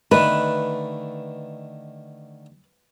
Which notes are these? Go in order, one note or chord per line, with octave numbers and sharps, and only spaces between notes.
D3 D#3 A3 B4